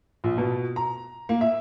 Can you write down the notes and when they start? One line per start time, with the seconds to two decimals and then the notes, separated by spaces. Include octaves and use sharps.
0.24 A#1
0.38 B2
0.76 A#5
1.29 A#3
1.41 E5